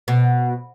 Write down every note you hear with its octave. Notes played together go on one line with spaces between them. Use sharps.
B2